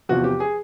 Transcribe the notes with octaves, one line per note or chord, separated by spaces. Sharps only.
E2 C3 F3 F#4
G4
G#4